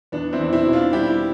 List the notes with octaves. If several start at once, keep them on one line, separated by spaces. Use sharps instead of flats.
E2 B3 D4
C4 E4
E2
C4 E4
B2
D4 F4
G3 E4 G4